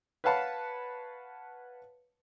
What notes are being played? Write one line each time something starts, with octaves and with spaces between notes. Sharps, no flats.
B4 C#5 F5 F#5 A5 B5